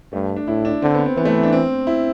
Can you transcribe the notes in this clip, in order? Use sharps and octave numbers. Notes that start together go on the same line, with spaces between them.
G2 A3
D4
A2 E4
D4
D3 C4
B3
C4
E3 B3
A3
C4
D4
C4
E4